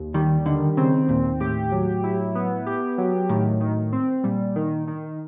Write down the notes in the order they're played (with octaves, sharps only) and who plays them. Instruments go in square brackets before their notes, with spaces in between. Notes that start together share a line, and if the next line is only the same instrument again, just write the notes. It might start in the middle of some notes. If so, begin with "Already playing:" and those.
Already playing: [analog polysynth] D#2
[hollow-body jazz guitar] D#3 [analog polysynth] G3
[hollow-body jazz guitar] D3 [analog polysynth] D#3
[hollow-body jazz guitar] C#3 [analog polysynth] C4
[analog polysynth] D#2 [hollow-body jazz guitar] A#2
[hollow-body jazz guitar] A2 [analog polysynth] G4
[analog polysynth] F#3
E4
B3
G4
F#3
[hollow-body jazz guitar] A2 [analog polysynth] D#3
[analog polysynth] D#3
C4
[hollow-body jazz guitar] A#2 [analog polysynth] G3
[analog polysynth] D#3
D#3